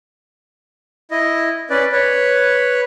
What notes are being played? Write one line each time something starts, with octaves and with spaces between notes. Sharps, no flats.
E4 D#5
C#4 B4 D5
B4 C#5